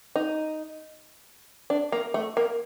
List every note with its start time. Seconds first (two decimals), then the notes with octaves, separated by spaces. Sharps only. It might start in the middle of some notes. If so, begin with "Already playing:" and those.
0.16 D#4
1.70 D4
1.92 A#3
2.14 A3
2.37 A#3